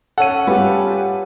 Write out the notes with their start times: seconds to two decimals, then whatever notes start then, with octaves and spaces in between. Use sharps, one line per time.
0.18 C#4 A4 F#5 D#7
0.47 G3 F4 G4 B4 G#5